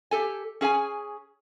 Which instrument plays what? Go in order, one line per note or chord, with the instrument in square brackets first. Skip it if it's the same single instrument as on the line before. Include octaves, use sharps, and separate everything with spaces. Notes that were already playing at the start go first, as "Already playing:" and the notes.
[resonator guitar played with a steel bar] G4 A4 G#5
C#4 G#4 F#5 G#5